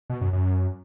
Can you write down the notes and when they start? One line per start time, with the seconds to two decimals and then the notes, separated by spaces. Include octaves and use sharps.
0.10 B2
0.21 F#2
0.33 F#2